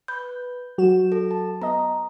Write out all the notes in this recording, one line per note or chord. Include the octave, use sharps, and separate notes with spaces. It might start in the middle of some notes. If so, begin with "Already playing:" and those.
B4 G6
F#3 F#4 E7
A4
A5
B3 D#5 A#5